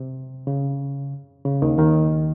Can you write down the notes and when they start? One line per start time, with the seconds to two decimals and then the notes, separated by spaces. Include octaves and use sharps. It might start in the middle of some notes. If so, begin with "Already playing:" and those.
Already playing: C3
0.47 C#3
1.45 C#3
1.62 D#2 D#3
1.78 D#2 D#3